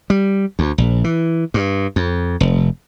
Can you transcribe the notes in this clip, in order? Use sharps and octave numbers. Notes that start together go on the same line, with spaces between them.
G3
D2
A#1
E3
G2
F2
F1